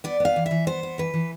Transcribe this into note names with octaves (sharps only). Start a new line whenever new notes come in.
B3 D5
B3 F5
E3
E5
E3
B3 C5
B3
E3 B4
E3